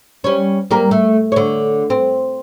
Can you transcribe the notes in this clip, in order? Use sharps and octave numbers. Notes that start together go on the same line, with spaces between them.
G3 C#4
G3 A#3 A#4
A3
D3 C#5
C4